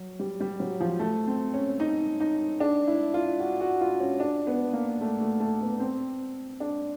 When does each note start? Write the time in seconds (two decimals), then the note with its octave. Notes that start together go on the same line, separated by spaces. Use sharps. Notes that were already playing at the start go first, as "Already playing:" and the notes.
Already playing: F#3
0.19 G3
0.41 G3
0.60 F#3
0.80 F3
0.99 A3
1.27 C4
1.54 C#4
1.80 D#4
2.20 D#4
2.60 D4
2.87 E4
3.14 F4
3.40 F#4
3.61 F#4
3.81 F4
4.00 C#4
4.20 D4
4.47 B3
4.73 A#3
5.01 A3
5.21 A3
5.40 A3
5.61 B3
5.80 C4
6.60 D4